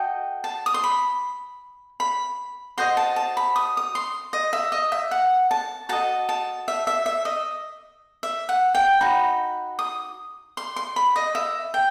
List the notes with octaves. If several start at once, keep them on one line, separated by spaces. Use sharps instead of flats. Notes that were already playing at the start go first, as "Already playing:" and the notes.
Already playing: F#4 A4 D#5 G5
A5
D#6
C6
B5
B5
F#4 C5 D#5 C6
A5
A5
B5
D#6
D#6
C6
D#5
E5
D#5
E5
F#5
A5
F#4 A4 D#5 A5
A5
E5
E5
E5
D#5
E5
F#5
G5
D#4 F#4 B5
D#6
C6
C6
B5
D#5
E5
G5